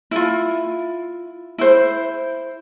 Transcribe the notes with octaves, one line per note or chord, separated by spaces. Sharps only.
E4 F4
E4 C5